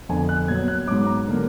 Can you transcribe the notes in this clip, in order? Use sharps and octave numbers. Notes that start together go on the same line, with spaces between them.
F2 D3 F3 B3 G#5
F#6
A#2 F#3 B3 G#6
F#6
G#2 F#3 B3 D6
A#5
D3 F#3 A#3